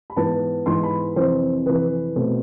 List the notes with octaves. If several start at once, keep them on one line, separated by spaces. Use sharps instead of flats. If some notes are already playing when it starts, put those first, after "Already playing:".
B5
G#2 E3 B3 A5
G#2 E3 B3 C6
B5
F2 C3 E3 C5
F2 C3 E3 B4
B2 A3 C4